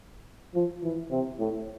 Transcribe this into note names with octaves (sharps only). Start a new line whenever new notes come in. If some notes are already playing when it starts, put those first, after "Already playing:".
F3
E3
C3
A2